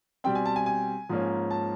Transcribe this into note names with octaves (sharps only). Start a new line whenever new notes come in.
B2 G3 C4 G5
G#5
A5
G#5
G#5
G#2 F3 A#3 C#4
A5